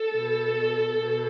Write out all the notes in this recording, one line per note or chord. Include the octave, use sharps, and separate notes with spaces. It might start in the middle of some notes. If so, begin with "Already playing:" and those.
Already playing: A4
B2
B2